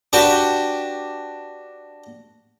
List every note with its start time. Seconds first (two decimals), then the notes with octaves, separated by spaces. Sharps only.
0.13 D4 F#4 G4 B4